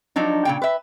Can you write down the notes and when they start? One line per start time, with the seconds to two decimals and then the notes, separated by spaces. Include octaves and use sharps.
0.16 F3 F#3 D4 D#4
0.45 A#2 C#3 G5
0.62 B4 E5